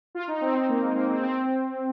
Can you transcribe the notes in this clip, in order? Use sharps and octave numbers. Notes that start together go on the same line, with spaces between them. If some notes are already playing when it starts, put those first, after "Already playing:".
F4
D#4
C4
C4
A#3
G#3
A#3
C4
C4